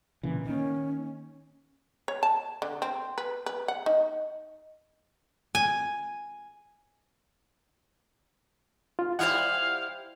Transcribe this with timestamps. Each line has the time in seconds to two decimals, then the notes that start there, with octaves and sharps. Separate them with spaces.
0.23 A#2 C#3 E3
0.45 D#3 A#3 C#4
2.08 C#5
2.23 A5
2.62 D3
2.82 C4
3.18 B4
3.46 B4
3.68 F#5
3.86 D#4
5.55 G#5
8.99 F4
9.19 G3 E4 C5 F5 F#5